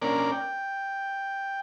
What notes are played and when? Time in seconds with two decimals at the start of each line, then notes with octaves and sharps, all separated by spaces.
0.02 A#3 C#4 D4 A#4 D5
0.32 G5